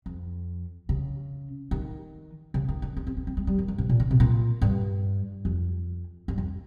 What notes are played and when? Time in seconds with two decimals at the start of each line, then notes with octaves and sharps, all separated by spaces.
0.06 F2
0.89 C#3
1.71 D#3
2.54 C#3
2.69 D#3
2.82 C#4
2.97 C4
3.07 C4
3.17 C#4
3.27 C4
3.37 G#3
3.47 G3
3.59 D#3
3.68 G2
3.78 G#2
3.89 A#2
4.00 C#3
4.11 C3
4.20 A#2
4.62 G2
5.45 F2
6.28 G2
6.38 F2